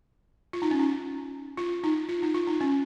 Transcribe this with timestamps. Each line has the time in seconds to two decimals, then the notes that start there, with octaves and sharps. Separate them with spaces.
0.53 F4
0.62 D#4
0.71 C#4
0.79 D#4
1.57 F4
1.84 D#4
2.09 F4
2.22 D#4
2.34 F4
2.47 D#4
2.61 C#4